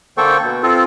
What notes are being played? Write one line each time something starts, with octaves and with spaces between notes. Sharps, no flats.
D3 A#3 A4 C5 G5 C#6
B2
C4 F4 A4